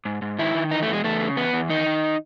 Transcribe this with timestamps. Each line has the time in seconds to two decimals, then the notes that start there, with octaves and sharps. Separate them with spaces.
0.05 G#2
0.22 G#2
0.39 D#3 E4
0.54 D#3
0.71 E3 D#4
0.82 A3
0.87 E2
0.93 G#3
1.04 E2 A3
1.21 C#3
1.37 E2 B3
1.53 E2
1.70 D#3 D#4
1.86 D#3